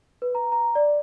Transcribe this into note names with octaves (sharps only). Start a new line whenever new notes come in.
B4
A#5
A#5
D5